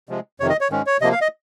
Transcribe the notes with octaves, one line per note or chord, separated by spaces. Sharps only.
C3 F3 G#3
F2 C3 D#3 C#5
D#5
C#5
G#2 D#3 G#3 C#4
C#5
C3 F3 A#3 D#5
F5
D#5